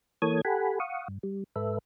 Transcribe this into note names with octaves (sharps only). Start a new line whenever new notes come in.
E3 A#3 A4 C#5 D#6 G#6
G4 A4 F#5 G#5 B5
F5 F#5 C#6 D#6
G2
G3
G#2 A4 B4 E5